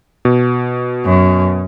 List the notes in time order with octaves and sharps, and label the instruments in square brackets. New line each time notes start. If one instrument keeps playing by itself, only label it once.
[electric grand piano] B2
[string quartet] F#2